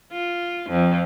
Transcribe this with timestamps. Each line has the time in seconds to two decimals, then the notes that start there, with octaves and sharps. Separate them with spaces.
0.12 F4
0.70 F2